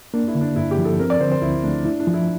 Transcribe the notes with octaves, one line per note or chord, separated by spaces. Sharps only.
A#3 D4
E4
D3
D4
G2 E4
G4
F3
A4
C4 A#4
D5
D3 C5
C5
D2 E4
A3 D4
D4 E4
D4
F3
E4